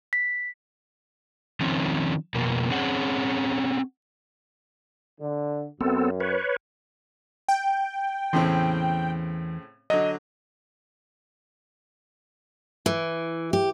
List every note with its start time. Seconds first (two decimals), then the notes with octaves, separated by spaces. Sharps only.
0.13 B6
1.61 D#3 F3 C4 C#4
2.34 F2 B2 A#3
2.71 C4 C#4 G#4 C#5 F#5
5.21 D3
5.81 F#2 B3 C4 A4
6.20 B4 C#5
7.48 G5
8.33 E2 A2 C#3 E3 C4 C6
9.90 D3 F#3 D#5
12.86 E3
13.53 G4